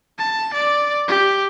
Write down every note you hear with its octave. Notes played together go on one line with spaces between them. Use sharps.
A5
D5
G4